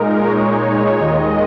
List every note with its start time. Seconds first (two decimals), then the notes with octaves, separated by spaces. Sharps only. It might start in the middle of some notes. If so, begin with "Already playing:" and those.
Already playing: A#2 G#3 D#4 A#4
0.26 C#5
0.98 D#2 D#3 G#3 D#5